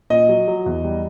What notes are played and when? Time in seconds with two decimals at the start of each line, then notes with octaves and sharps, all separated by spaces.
0.10 A#2 D#5
0.29 F#3
0.48 F#3
0.66 E2
0.84 G3